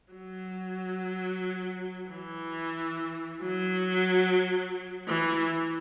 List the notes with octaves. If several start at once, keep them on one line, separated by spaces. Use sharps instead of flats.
F#3
E3
F#3
E3